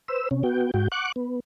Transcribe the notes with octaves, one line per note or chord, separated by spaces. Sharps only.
B4 C5 E6
C3 C#4
B3 F#4 G5
G#2 F#4 G5
F#5 C#6 D6 F#6
B3